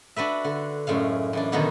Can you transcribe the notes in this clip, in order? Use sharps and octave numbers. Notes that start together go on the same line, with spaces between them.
D4 F#4 B4 E5
D3
F#2 A2 G#3 F5
F#2 E3 D4
B2 D3 D#3 B3 D#4 F#4